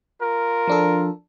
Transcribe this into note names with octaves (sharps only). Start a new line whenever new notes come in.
F4 A#4
F3 D4 A4